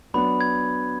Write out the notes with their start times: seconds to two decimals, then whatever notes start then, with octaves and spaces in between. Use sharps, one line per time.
0.14 F#3 B3 D4 F#4 B5
0.41 G#6